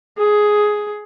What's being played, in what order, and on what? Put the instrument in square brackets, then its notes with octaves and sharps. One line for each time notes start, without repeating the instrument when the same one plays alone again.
[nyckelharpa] G#4